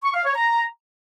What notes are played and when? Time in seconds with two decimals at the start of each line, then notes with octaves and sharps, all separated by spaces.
0.03 C#6
0.14 F5
0.25 C#5
0.36 A#5